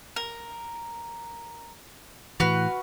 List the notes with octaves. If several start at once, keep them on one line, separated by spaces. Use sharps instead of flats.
A#4
A2 E3 F#4 B4 F6